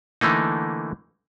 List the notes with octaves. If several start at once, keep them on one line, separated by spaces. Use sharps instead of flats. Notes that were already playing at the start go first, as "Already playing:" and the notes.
D3 E3 A3 A#3 D#4